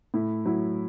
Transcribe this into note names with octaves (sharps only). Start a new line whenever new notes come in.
A2 E4
F#3 E4